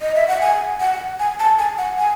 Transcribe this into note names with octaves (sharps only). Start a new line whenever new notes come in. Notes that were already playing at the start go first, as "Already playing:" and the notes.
D#5
E5
F#5
G#5
F#5
G#5
A5
G#5
F#5
G#5